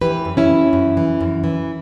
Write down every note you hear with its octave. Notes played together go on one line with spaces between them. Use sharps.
E3 G4 B4
F#2
C#4 E4
E3
F#2
E3
F#2
E3